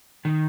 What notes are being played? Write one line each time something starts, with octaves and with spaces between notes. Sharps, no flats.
D#3